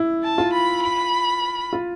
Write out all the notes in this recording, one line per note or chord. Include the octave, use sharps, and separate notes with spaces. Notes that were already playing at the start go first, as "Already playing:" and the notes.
Already playing: E4
A5
F4
B5
B5
F4